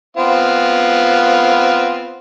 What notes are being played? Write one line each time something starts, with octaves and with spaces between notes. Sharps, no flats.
B3 C4 F4